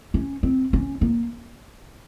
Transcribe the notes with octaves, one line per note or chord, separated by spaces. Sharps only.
C#4
C4
C#4
A#3